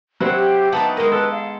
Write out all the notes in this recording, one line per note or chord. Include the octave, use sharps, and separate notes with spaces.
F#3 C4 E4 F#4
G4
B3 D#4 D5 A5
G#3 A#4 D#5
A4 B4
F5